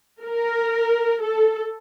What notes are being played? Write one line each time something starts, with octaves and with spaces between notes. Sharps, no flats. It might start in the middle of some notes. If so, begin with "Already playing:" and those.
A#4
A4